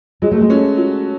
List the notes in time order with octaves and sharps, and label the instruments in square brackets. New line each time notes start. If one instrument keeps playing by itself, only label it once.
[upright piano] F#3 [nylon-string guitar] G#3
[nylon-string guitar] A3
G#3
[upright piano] A3 C#4
F#3